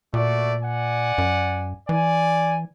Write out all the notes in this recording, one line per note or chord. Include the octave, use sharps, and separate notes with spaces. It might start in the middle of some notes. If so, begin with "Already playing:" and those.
A#2 A3 F#4 D5
D5 F#5 G#5
F#2
E3 D5 G#5